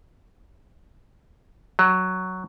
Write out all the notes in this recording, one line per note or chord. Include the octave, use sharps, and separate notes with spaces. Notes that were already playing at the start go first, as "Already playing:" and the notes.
F#3